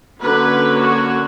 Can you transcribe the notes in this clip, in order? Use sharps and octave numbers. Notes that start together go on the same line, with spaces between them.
D3 F#3 A#3 C#4 B4
F#4